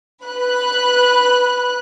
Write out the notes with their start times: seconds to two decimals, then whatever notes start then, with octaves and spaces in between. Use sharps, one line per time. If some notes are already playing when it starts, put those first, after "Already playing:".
0.24 B4 F#6